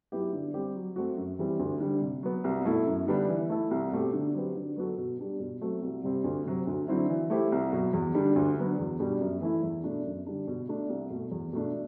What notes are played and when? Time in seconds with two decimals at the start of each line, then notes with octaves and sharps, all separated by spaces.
0.12 F#3 B3 E4 G4
0.33 D3
0.54 G3 C4 G4
0.75 F#3
0.96 A3 C4 F#4
1.17 F#2
1.39 E3 G3 C4
1.59 D2
1.80 D3 G3
2.01 C3
2.23 F#3 B3
2.44 C2
2.65 B2 A3 E4 A4
2.87 F#2
3.07 D3 G3 B3 D4
3.29 E3
3.49 A3 E4 A4
3.71 C2
3.92 B2 A3 C4 G4
4.13 D3
4.34 F#3 C4 G4 B4
4.56 D3
4.76 F#3 B3 F#4 A4
4.98 B2
5.19 G3 D4 G4
5.40 B2
5.61 F#3 A3 C4 F#4
5.82 C2
6.04 C3 G3 C4
6.24 D2
6.46 C3 F#3 C4
6.67 D2
6.88 D3 F#3 C4 E4
7.09 E3
7.30 A3 E4 G4 C5
7.52 C2
7.73 B2 F#3
7.93 E2
8.14 D3 G3 D4
8.36 D2
8.57 D3 F#3 B3
8.78 E2
9.00 B2 G3 D4
9.21 F#2
9.41 E3 A3 E4
9.63 E2
9.84 B2 A3 D4
10.05 F#2
10.26 D3 G3 D4
10.47 B2
10.69 A3 D4
10.89 C2
11.10 B2 A3
11.31 E2
11.53 B2 A3 D4